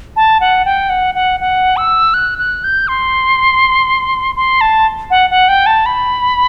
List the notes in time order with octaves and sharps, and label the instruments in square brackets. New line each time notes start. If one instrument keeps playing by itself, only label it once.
[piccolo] A5
F#5
G5
F#5
F#5
F#5
E6
F#6
F#6
G6
C6
C6
A5
F#5
F#5
G5
A5
B5